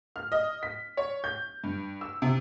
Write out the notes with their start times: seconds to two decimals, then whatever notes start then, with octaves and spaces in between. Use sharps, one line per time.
0.16 F6
0.32 D#5
0.63 B6
0.97 C#5
1.24 G6
1.64 G2
2.01 E6
2.22 C3